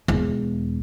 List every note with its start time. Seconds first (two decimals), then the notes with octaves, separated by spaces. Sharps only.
0.08 E1